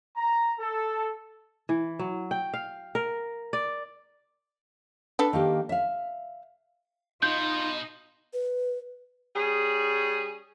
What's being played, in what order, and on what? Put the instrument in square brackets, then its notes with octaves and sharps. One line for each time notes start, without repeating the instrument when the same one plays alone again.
[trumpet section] A#5
A4
[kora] E3
F#3
G5
F5
A#4
D5
[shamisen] D4 A4 B4
[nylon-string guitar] D#3 A#3 G4
E5 F5
[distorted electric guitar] B2 [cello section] D#4 [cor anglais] F4 [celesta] G6
[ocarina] B4
[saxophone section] G3 C#4 G#4